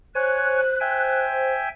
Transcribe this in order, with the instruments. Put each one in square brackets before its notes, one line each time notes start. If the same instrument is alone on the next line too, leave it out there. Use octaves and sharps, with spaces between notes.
[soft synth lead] C5 [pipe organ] C#5 G#5 [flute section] F#6
[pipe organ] E5 G5 G#5